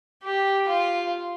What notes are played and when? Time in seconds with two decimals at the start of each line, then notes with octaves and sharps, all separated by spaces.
0.24 G4
0.68 F4